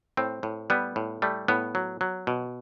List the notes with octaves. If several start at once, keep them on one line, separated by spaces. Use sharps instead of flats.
A2 C4
A2
G3 B3
A2
G3 A3
A2 B3
F#3
F#3
B2